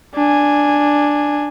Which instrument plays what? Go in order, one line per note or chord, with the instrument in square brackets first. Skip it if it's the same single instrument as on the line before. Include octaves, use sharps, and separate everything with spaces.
[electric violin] D4 G#5